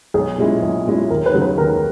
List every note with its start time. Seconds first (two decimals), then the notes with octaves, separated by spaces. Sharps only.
0.14 B1 G#4
0.38 A#2 G#3 C#4 E4
0.63 B1
0.86 A#2 G#3 C#4 E4
1.10 D#2 A#4
1.26 B4
1.34 C#3 F#3 C#4
1.42 B4
1.58 D#2 A#4